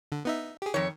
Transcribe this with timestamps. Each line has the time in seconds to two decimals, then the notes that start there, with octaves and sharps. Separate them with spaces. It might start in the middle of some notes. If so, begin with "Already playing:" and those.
0.12 D3
0.25 B3 D#4 E5
0.62 G4 G#4
0.74 F2 D#3 C#5